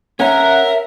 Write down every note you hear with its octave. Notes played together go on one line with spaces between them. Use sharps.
C#4 A#4 E5 F#5 A#5